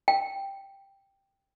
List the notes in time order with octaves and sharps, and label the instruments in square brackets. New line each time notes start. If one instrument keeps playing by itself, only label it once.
[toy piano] G5